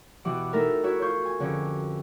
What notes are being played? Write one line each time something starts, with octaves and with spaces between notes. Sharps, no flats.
B2 E3 G4 F#5 D6
A3 D#4 E4 A4 A#4 E5
E4 F#4 C#5 E5
F4 C#5 C#6 G6
G#5
F2 D3 C#4 F#4 G#4